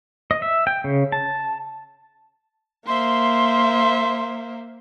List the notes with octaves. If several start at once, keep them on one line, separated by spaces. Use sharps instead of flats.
D#5
E5
G5
C#3
A5
A#3 C5 E5 C6